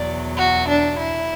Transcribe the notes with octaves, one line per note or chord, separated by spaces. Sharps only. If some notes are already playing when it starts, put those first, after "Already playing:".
Already playing: E2 B2 F#3 D5
F#4
D4
E4